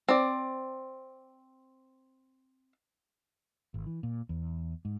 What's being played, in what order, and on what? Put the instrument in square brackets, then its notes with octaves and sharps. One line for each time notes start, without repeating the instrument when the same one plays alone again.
[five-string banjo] C4 D5
[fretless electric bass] G#1
E3
A#2
E2
G#2